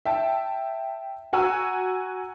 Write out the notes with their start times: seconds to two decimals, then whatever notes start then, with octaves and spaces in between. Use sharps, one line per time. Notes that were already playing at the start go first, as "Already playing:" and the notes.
0.05 E5 G5 A5
1.33 F#4 F#5 G#5 A#5 C#6 E6